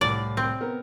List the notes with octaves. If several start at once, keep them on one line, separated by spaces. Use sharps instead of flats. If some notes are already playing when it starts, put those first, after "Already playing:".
C2 A2 D5
C4
B3 A#4